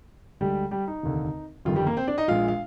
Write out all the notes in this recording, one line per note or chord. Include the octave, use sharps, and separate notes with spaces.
D2 D3 G3 G#3 G4
G3 G4
D#4
F1 D#2 D3
G1 F2 D#3 G3 F4
G3 G4
A#3 A#4
C4 C5
D4 D5
D#4 D#5
A#1 A#2 G#3 F4 F5
F5